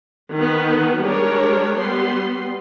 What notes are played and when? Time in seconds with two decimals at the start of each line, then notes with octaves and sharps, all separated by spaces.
0.34 D#3 B3
1.02 G3 G#3 D4 A#4 C#5
1.76 G3 B3 C6